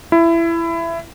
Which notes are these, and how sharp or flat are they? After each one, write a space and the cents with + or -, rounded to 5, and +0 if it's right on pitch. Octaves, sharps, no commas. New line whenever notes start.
E4 +20